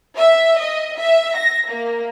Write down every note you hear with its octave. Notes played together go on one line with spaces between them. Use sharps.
E5
D#5
E5
A#6
A#3